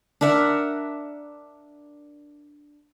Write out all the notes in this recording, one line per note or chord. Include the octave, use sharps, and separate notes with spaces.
D4 A#4 E5 F#5